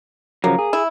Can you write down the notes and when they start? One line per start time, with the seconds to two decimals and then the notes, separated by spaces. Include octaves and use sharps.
0.44 C#3 F3 F#3 A#3
0.58 G#4
0.73 E4